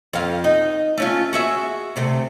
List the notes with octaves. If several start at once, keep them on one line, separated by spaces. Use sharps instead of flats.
F2 F5
D#4
A3 C#4 F4
F#4 G#4 E5
D2 C3 A3